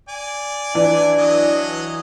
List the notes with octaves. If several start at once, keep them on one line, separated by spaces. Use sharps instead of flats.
D5 G#5
E3 D4
F#3 D#5